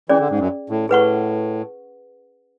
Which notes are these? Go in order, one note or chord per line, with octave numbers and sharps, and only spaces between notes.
E3 C#4 G#4 D5
D3
G#2
F#2
A2
A2 G#4 B4 F#5 C#6